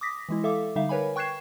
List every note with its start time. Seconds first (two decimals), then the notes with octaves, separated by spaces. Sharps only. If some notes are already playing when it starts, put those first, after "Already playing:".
0.01 D6 D#6 A#6 B6
0.29 E3 G#3 E4
0.44 A4 E5 F5 D6
0.76 D3 G3 D#4 E5 F5
0.89 A#4 B4 C#5 G#5 B5
1.16 G5 C#6 F#6 G#6 C7 E7